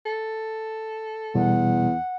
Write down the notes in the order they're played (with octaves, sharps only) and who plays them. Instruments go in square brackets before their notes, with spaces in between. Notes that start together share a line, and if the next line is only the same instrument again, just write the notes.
[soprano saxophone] A4
[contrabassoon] E2 [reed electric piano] B2 G3 [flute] F#5